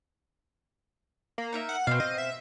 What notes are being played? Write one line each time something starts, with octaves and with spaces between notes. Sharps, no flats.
A#3
D#4 A#4 E5
F#5
B2 C4 F#4 F5
D#5
E5